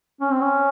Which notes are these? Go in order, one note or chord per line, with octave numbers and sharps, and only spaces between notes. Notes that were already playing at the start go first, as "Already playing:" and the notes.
C#4
C4
C#4